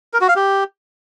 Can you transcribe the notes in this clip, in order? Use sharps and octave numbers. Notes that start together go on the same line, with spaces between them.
A#4
F#4
F5
G4